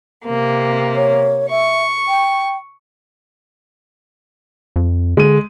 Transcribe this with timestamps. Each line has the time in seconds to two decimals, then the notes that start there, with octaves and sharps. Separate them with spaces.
0.24 C3 A#3
0.96 C#5
1.50 E5 C#6
2.08 G5
4.76 F2
5.17 D3 G#3 D#7